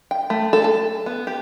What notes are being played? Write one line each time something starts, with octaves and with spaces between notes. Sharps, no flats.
G5
A3
A4
A5
B3
G4